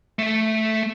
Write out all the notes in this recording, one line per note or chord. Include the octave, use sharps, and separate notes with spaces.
A3 E5